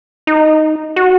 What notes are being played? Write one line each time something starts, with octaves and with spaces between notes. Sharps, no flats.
D#4
F#4